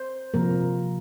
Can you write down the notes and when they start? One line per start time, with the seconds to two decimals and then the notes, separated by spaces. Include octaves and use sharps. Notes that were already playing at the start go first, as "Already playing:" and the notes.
Already playing: C5
0.34 C3 F3 A#3 A#4